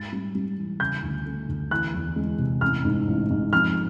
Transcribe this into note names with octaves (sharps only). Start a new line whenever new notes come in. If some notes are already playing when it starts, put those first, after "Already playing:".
Already playing: G#2 A6
G3
G3
E3
C#3 G6
D2
A3
D2
E3 F#6
E2
G#3
C3
A1 F6
G#2
A1
G#2
F2 F6